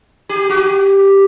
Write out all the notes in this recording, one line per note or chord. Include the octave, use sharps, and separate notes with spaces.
G4
F#4
G4